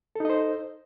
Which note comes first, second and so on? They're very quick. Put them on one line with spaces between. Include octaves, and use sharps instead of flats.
A4 D#4 D#5 C5